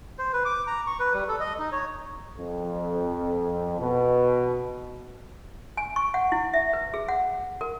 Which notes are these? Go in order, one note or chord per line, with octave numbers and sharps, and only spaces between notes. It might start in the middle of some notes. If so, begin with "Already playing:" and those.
C5
B4
D6
A#5
C#6
B4
G3
A4
D#5
D#4
C#5
F2
B2
G#5
C#6
F#5
E4
E5
B4
G#4
F#5
A#4